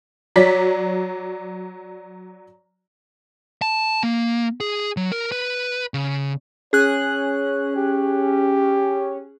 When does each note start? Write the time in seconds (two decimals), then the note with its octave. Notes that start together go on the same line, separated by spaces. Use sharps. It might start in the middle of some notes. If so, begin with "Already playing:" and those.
0.36 F#3 D5 B6
3.62 A5
4.03 A#3
4.60 G#4
4.97 F#3
5.12 A#4
5.32 B4
5.94 C#3
6.73 C#4 G#4 C#5 F#6
7.76 G4